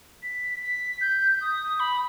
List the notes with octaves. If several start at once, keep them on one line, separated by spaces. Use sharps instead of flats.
B6
B6
G6
D#6
B5